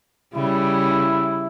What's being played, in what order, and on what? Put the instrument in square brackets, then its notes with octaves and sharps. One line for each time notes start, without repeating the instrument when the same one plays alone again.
[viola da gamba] C#3 G3 [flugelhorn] E4